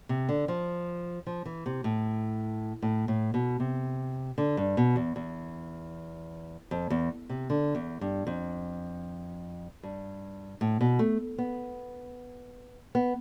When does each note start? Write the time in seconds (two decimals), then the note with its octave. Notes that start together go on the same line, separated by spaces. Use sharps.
0.09 C3
0.29 D3
0.48 F3
1.27 F3
1.46 E3
1.66 C3
1.84 A2
2.82 A2
3.08 A2
3.34 B2
3.60 C3
4.38 D3
4.57 G2
4.77 B2
4.96 E2
5.16 E2
6.71 F2
6.90 E2
7.29 C3
7.50 D3
7.75 E2
8.01 G2
8.27 F2
9.83 G2
10.61 A2
10.81 B2
10.99 A3
11.38 B3
12.95 B3